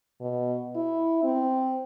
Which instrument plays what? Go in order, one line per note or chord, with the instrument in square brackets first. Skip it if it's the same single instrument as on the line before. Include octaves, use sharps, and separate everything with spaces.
[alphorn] B2
E4
C4